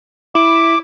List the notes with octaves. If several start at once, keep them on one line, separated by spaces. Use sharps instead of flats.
E4 D6